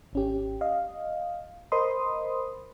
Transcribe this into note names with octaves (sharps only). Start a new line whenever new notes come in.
G#1 C#4 G4
D#5 F5
A#4 C5 D#5 B5 C6 D#6